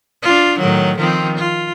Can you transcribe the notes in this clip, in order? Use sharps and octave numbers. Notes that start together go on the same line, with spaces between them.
D4 F4
A2 D#3 F#3
D#3 F3 C4
F4